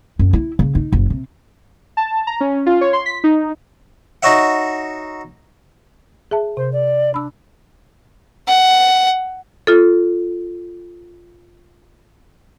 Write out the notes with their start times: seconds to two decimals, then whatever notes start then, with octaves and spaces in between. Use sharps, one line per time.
0.19 F#2
0.33 E4
0.59 C#3
0.75 D#4
0.92 F#1
1.10 C3
1.97 A5
2.27 A#5
2.41 C#4
2.66 F4
2.81 C#5
2.93 C6
3.06 B6
3.24 D#4
4.23 D#4 F#4 C#5 E5 F#5
6.31 G#4 E5 A5
6.57 C3 C5
6.72 D5
7.14 D4 B5 E6
8.48 F#5
9.67 F4 A4